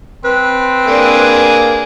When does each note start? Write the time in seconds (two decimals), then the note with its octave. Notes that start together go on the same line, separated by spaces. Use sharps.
0.24 C4 B4
0.87 A#3 D4 G#4